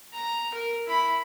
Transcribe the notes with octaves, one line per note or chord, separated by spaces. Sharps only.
A#5
A#4
E4 B5